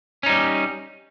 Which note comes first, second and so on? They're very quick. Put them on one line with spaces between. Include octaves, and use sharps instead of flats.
C#4 D#4 G3